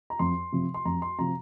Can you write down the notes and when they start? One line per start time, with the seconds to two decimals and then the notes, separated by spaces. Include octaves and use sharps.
0.10 A#5
0.19 F2 C6
0.52 C3 F3
0.74 C6
0.85 F2 A#5
1.02 C6
1.18 C3 F3 A#5